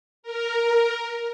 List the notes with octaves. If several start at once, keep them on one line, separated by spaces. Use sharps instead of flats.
A#4